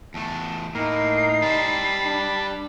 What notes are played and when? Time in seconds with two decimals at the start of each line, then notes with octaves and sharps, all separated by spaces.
0.14 E2 A3 A5
0.75 A2 A#3 D#4 C7
1.42 G3 C5 A5 B5
2.05 D4